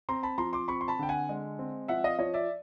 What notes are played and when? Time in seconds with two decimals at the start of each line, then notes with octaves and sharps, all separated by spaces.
0.09 C4 A#5 C6
0.23 A5 B5
0.38 F3 A#5 C6
0.53 C6 D6
0.68 C4 B5 C#6
0.81 C6
0.88 A5 B5
0.99 D3 G5
1.09 F#5 G#5
1.29 G#3
1.59 C4
1.88 F3 E5 F#5
2.04 D#5 F5
2.19 F3 C#5 D#5
2.34 D5 E5